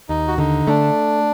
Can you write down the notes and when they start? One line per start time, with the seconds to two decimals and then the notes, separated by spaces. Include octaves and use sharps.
0.09 D#2 D#4
0.28 F#4
0.38 D3 D#4
0.67 A3 D4